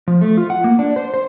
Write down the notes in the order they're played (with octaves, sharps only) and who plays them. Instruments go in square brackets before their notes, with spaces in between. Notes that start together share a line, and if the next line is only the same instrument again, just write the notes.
[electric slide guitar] F3
A3
F4
F#5
A#3
D4
C5
C5